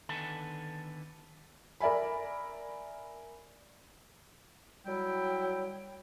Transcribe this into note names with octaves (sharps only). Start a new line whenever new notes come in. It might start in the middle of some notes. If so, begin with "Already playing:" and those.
D3 D#3 B3 A4 G#5 A5
A#4 D5 E5 G#5 B5
F#3 G3 E4 G5